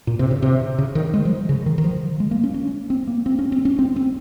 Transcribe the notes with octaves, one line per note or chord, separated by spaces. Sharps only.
A#2
C3
C#3
C3
C#3
D#3
G#3
F3
C#3
D#3
D#3
F3
G#3
A#3
C#4
C#4
C4
A#3
C4
C#4
C4
C#4
C4
C4